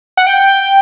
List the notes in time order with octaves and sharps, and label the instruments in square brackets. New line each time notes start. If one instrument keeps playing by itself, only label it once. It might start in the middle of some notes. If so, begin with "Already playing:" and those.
[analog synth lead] F#5
G5